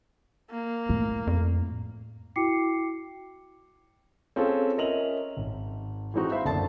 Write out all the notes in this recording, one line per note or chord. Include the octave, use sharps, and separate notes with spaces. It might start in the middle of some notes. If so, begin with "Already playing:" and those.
A#3
A2
F2
E4 F#4 G5 D6 C7 C#7
C4 C#4 F4 G#4 A4
C#4 A#4 D#5 E5 F7 F#7
G#1
E3 G#3 C4 D#4 F#4
C5 E5 F5 B5 C6
F#1 D3 A5 A6